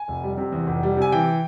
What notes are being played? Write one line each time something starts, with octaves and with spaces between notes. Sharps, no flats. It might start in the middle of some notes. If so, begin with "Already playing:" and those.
Already playing: G#5
F1
G3
C3
E2
F1
G3
C3 G#5
E3 G5